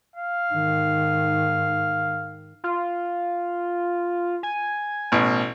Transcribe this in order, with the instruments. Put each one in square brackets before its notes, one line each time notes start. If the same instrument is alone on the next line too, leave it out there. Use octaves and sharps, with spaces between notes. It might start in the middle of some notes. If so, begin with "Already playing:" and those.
[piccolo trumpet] F5
[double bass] G#2 D#3
[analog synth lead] F4
G#5
[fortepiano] A1 B2